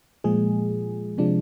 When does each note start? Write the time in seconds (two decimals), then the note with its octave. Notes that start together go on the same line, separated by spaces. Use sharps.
0.24 A#2 F3 G#3 G#4
1.18 C3 F3 G#3 D4